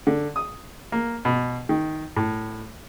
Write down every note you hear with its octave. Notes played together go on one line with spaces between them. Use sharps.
D3
D#6
A#3
B2
D#3
A2